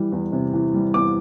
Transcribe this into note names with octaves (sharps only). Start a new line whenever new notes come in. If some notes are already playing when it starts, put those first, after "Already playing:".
Already playing: E3 G3
E2
C3
E3
G3
E2 D6